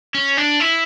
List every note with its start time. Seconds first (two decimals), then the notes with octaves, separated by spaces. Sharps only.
0.15 C#4
0.37 D4
0.60 E4